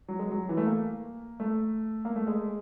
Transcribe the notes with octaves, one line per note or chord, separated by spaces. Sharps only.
F#3
G#3
F#3
E3
A3
A#3
A3
A#3
A3
G#3